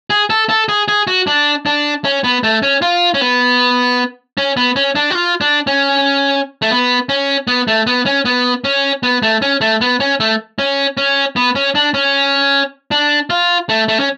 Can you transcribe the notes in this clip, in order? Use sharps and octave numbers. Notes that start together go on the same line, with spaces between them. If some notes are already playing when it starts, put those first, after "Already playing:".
G#4
A4
A4
G#4
G#4
F#4
D4
D4
C#4
B3
A3
C#4
F4
C#4
B3
C#4
B3
C#4
D4
F#4
F4
D4
C#4
A3
B3
C#4
B3
A3
B3
C#4
B3
C#4
B3
A3
C#4
A3
B3
C#4
A3
C#4
C#4
B3
C#4
D4
C#4
D4
F4
A3
A3
C#4